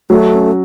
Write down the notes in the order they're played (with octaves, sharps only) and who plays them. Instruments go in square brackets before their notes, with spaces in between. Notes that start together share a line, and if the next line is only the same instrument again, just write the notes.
[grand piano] F#3 [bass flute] A3
[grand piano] C#4